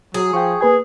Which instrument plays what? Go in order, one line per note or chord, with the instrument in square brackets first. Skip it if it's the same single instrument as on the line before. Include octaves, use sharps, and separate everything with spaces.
[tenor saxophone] F#3 [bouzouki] G#4
[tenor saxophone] F3 [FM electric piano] G5 C#6
[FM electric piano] A#3 B4 G#5 [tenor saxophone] G#4